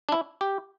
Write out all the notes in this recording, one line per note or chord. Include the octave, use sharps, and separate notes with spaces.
D4
E4
G4